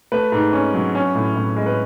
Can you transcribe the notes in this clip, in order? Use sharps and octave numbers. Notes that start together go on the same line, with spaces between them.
A3 B4
G#2
C#4
F#3
C#4
A2
A2
G#3
B4